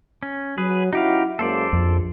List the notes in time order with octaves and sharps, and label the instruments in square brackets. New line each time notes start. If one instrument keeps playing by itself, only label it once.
[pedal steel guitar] C#4
[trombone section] F#3 [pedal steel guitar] G#4 B4
[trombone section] C#4 E4 F#4 [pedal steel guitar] D#4 G4 F5
[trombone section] F#2 G#3 A#3 [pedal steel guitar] A4 C5 D5
[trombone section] A#1 [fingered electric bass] F2